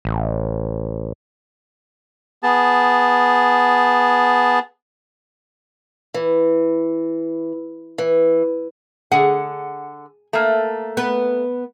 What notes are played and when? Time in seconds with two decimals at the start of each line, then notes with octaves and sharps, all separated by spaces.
0.05 A1
2.43 B3 G#4 A5
6.14 E3
7.98 E3
9.12 D3 G#4 F#5
10.33 A3 A#3
10.97 B3 B4